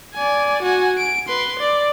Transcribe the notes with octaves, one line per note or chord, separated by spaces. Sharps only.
D5 G#5
F#4 G#5
D7
B4 C6
D5